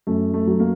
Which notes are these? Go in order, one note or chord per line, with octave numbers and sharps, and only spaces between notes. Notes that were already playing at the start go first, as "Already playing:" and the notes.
F#2 A3
A3
F#3
A#3